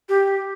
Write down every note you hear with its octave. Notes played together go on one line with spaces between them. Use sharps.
G4